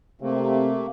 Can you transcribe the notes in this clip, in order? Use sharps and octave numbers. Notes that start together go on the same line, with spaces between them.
C3 A3 A#3